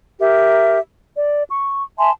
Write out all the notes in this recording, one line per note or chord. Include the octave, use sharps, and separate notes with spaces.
G4 A#4 E5
D5
C#6
E5 G#5 A5 C6